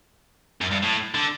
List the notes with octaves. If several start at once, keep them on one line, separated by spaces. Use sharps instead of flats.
F#2
G2
A2
D3